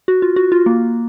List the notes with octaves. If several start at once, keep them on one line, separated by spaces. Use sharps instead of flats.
F#4
F4
F#4
F4
A#3